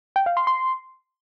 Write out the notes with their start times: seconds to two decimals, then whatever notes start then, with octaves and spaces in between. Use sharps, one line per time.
0.16 G5
0.26 F5
0.37 C6
0.47 C6